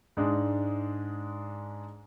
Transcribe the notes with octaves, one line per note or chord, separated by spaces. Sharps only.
G#2 G#3 D4